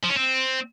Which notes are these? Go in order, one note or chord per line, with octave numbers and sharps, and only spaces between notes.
F3
C#4
C4